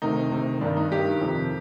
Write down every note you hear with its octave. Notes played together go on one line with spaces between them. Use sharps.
D2 C3 D#3 D#4
D2 C3 D#3
G2 D#3 D4
D#4
G2 D#3 G4
F2 C3 D#3